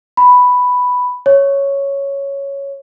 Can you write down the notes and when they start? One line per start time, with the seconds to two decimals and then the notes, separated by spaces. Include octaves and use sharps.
0.17 B5
1.26 C#5